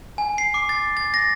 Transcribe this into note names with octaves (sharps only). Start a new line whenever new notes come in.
G#5
C7
D6
A6
A6
A#6